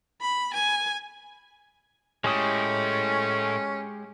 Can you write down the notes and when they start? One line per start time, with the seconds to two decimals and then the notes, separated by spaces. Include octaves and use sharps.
0.21 B5
0.54 G#5
2.24 A2 G#3 A3 C#4 G4 D#6